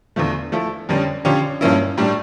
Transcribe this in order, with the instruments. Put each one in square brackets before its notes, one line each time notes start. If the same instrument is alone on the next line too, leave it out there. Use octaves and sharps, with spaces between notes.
[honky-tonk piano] E2 D3 F3 A3
F3 A3 E4 A4
F2 D3 G3 C#4
D3 F3 C#4 G4 C#5
G2 F3 A#3 C#4 E4
A2 G3 D4